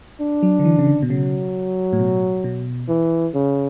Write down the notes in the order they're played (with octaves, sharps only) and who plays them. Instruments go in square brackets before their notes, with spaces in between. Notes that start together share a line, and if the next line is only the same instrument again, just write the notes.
[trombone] D4
[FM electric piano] F#3
D3
E3
C#3
D3
B2
[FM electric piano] C#3 [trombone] F#3
[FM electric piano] A2
B2
B2
[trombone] E3
C#3